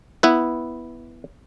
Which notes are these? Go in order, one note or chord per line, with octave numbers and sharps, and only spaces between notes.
B3 E4 B4